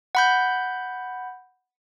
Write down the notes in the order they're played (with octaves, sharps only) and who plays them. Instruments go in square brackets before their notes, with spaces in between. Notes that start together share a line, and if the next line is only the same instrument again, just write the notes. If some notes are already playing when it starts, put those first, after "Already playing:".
[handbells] F#5 B5 G6